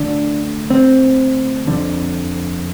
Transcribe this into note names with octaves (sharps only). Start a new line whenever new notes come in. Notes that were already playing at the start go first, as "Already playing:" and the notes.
Already playing: D2 D3 D4
C4
F2 D3